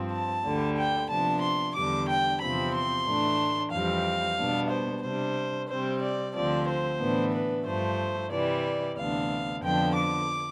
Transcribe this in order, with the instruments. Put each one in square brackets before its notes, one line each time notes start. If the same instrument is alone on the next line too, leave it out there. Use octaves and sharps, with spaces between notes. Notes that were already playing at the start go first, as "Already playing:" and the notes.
Already playing: [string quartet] G2 F3 C4
A5
D2 D3 G3
G5
C3 F3 B3 D4 A5
C6
E2 D3 G3 D4 D6
G5
E2 C3 F3 C4 B5
C6
A2 E3 A3 D4
F2 E3 G3 C4 F5
B2 G3 B3 D4
C5
C3 G3 D4 C5
C3 G3 C4 C5
D5
D2 D3 F3 C4 D5
C5
A2 E3 B3 D4
B4
G2 F3 A3 C5
C3 E3 G3 D5
D2 C3 E3 B3 D4 F5
F2 D3 F3 B3 D4 G5
D6